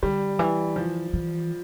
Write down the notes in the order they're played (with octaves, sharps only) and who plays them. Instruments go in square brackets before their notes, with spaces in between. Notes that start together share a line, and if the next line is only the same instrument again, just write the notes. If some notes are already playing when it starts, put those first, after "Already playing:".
[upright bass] D3 [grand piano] G3
[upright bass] E3
[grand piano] F3
[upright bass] E3